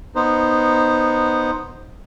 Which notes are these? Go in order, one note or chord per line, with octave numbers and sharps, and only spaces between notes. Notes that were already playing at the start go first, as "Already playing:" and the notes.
B3 D#4 C5